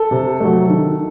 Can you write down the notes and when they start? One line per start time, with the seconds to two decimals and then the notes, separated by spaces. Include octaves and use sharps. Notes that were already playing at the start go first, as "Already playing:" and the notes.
Already playing: A4
0.11 C3
0.40 F#3 A3
0.70 D#3